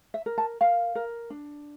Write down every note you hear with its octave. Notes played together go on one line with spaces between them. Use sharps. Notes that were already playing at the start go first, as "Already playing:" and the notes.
E5
A#4
A5
A#4 F5
A#4
D4